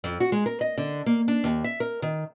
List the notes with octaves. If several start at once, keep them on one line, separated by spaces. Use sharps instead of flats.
F2
F#4
G#3
A#4
D#5
D3
A#3
D4
D#2
E5
A#4
D#3